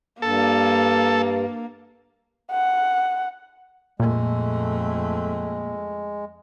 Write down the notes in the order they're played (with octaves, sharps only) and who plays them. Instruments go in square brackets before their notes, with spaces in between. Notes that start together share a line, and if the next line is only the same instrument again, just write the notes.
[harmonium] G2 [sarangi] A#3 [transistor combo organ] A4
[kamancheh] F#5
[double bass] F2 A3 [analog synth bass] A#2 [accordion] G#3